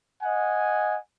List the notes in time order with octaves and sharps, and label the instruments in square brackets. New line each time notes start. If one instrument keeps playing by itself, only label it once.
[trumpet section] D#5 F#5 G#5